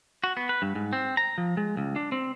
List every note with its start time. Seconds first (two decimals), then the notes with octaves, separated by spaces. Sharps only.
0.24 F#4
0.37 B3
0.49 B4
0.62 G2
0.75 G#2
0.93 C4
1.17 A#5
1.38 F3
1.57 G#3
1.77 C#2
1.96 D4
2.12 C4